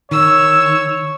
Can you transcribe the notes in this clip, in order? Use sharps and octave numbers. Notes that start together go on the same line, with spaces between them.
D#3 C#5 E6